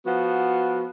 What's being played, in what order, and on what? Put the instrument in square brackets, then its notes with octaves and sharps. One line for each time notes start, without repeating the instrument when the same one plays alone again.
[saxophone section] F3 B3 F#4